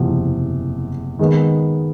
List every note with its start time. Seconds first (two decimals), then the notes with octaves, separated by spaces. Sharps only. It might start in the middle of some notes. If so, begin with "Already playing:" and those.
Already playing: F#1 E2 C3 F3
1.19 D#3 G#3 B3